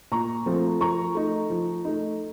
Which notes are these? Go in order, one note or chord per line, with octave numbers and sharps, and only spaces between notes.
A#2 A#5 C#6
F3 A3 C4 F4
F3 A#5 C#6
A3 D#4
F3
A3 D#4